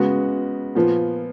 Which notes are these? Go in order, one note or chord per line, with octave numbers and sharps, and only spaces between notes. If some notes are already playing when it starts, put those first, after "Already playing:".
Already playing: C#3 G#3 B3 F#4
A#2 F3 B3